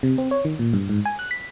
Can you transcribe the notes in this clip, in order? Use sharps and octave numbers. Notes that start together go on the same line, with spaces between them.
C3
C4
C#5
D#3
A#2
G2
G#2
G#5
F#6
B6